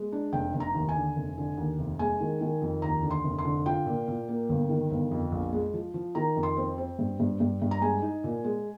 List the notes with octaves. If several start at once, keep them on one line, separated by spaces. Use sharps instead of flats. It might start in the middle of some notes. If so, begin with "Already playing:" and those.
Already playing: G#3
D4
F1 G5
F1
A#5
D#2
G#5
D3
F1
D3
D#2
F1
G#3 G#5
D#3
D#3
F2
D#2 A#5
D3
C6
F1
C6
D3
F4 G5
A#2
A#2
A#3
G1
D#3
G1
F2
A#1
G#3
F3
F3
D#3 A#5
F2
C6
C4
C4
G2
G2
G2
G2
A#5
G#3 G#5
D#4
A#2
G#3